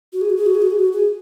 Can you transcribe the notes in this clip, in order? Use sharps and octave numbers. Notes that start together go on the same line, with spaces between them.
F#4
G#4
F#4
G#4
F#4
G#4
F#4
G#4
F#4
G#4